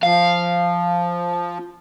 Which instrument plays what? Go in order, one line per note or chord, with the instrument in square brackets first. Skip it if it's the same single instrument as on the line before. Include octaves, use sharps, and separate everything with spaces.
[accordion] F3 [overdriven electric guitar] F5